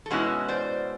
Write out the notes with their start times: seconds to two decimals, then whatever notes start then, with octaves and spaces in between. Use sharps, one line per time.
0.06 A4
0.10 B2 G#3 C#4 E4 F#4 G#4
0.48 C5 D5